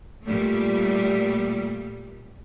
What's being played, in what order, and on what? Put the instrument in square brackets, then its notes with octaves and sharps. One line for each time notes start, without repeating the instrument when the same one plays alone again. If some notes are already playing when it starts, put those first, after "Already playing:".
[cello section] A#2 G3 A3